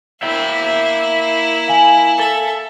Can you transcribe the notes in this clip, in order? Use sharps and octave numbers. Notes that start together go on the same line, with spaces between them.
A#3 E4 E5 G5
F5 G#5 F#7
A4 E5